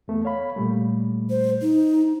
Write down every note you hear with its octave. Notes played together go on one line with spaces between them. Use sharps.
E2 A3 B3
C#5 F5 B5
A#2 G3 A3
C5
D#4